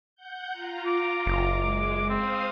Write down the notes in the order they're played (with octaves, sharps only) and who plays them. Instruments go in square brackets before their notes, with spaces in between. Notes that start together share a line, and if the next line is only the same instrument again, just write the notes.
[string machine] F#5 G6
F4 A#5
[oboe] D6
[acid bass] F#1
[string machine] G#3
[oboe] C4 [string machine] C5 F5 D#6